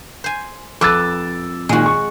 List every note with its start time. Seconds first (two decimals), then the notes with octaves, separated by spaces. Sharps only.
0.24 C5 G#5
0.81 F2 B4 D6 E6 A6
1.69 A#2 D#3 G#3 F#4
1.86 C#6